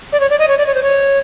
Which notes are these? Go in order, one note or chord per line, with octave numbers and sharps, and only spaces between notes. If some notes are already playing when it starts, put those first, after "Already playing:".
D5
C#5
D5
D#5
C#5
D5
C#5
C5
C#5